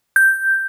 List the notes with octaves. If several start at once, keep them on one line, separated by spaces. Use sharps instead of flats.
G6